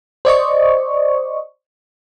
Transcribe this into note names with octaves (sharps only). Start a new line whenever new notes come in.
C5 D5 D#5 C#6